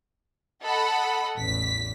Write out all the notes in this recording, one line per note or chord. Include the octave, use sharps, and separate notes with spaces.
A4 D#5 F#5 B5
A1 E2 B6